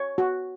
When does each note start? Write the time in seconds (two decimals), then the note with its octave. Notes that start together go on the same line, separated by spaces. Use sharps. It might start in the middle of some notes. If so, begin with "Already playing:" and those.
Already playing: C#5
0.18 F#4